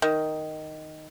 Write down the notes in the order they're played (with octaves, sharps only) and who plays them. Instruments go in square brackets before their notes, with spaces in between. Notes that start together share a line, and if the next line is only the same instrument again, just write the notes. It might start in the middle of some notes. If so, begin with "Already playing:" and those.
[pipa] D#3